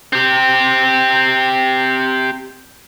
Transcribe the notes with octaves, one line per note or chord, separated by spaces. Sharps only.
C4 G4